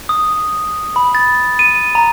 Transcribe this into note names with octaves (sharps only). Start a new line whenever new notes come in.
D#6
B5
A6
D#7
A#5